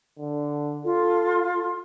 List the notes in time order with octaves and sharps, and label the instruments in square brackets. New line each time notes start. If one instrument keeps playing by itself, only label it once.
[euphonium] D3
[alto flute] F4 [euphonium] A4